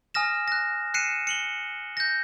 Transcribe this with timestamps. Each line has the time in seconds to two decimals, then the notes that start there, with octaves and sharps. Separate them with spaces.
0.14 G#5 D#6 F6 A#6 E7
0.48 F#6 A#6
0.94 F#6 C7 C#7 D#7 E7
1.27 C#7 F#7 G7
1.97 G6 A#6